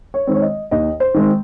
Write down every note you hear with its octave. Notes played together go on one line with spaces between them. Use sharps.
C#5
D#3 G#3 C4
C#5
D#5
D#2 D#5
C5
D#3 G#3 C4